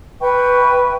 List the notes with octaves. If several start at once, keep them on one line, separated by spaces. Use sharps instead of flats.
B4 E5 G5 C#6